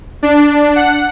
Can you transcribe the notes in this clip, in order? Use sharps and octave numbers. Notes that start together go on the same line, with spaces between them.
D4
F#5